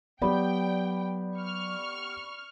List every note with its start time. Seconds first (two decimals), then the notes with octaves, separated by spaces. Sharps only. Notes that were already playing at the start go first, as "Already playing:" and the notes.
0.22 F#3 B3 G4 D5 G5 B5
1.38 C#6 F6